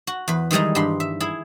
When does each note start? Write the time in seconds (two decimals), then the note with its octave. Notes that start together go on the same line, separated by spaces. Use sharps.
0.07 F#4
0.28 E2 B4
0.51 D#3 E3 G3 G#3 D#4
0.75 G2 G4 B5 C6
1.00 E5
1.20 E4 G#4